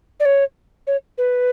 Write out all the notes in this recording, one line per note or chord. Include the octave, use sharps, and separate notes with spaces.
D5
C#5
C#5
B4